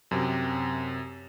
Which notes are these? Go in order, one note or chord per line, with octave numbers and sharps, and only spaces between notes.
F#2 C3